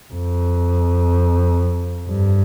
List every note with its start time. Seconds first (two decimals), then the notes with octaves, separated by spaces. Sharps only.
0.13 F2
2.08 G2